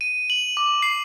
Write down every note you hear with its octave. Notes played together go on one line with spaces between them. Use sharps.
D#7
F#7
D6
C7